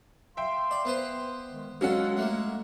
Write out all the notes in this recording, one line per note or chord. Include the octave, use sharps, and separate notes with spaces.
E5 F5 G5 C6
D5
B3 B4 C5
D#3 G#3
F#3 G#3 C#4 F4 A4 F#5
A3 A#3